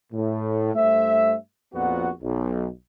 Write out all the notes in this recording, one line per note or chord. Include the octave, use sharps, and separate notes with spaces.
A2
G2 A3 C5 E5
A#1 F2 A#2 B3 F#4 F#5
B1